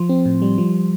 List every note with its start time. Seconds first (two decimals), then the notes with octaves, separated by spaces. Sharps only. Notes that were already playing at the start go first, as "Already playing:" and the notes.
Already playing: F3 C6
0.09 C4
0.26 A2
0.42 G3
0.58 F3